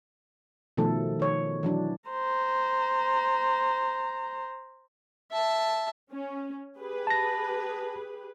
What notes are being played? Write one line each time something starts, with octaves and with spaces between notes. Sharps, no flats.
B2 D#3 F3 A3 A4
D#3 C#5
E3 F#3 D4
C5 A#5
E5 A5
C#4
G4 G#4 B4
A5 A#6